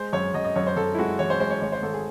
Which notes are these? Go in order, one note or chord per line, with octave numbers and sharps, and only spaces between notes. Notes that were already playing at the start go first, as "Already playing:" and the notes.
Already playing: G#3 C5
F#2 C#5
F#2 D#5
D#5
F#2 C#5
C5
F#2 A4
E4
G#3 F#4
E3 C#5
C5
G#3 C5
C#5
G#1 C#5
C5
G#1 A4
G#4